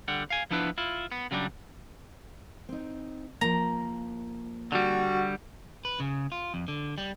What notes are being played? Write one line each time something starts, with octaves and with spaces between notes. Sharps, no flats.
D3 G3 F#5
F5 G#5
F3 B3 D4 E4 B4
E4 F4
B3
C#3 F#3 G3 C4 D4
C4 D#4
F3 A#3 A#5
D3 G3 F#4
B4
C#3
F4
F2
D3
G3